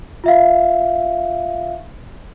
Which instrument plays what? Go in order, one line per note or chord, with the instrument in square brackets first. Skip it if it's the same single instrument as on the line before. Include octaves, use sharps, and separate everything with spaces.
[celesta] F4 E5 F5